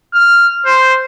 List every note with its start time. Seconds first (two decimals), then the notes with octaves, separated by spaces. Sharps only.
0.14 F6
0.65 C5